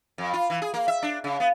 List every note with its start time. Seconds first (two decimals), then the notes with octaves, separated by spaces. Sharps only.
0.18 F2
0.33 F4
0.50 E3
0.62 G#4
0.74 A#3
0.88 E5
1.03 D4
1.24 C#3
1.40 B3